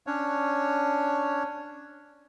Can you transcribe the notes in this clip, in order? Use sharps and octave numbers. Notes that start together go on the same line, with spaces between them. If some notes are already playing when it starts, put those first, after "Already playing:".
C#4 D4 C#5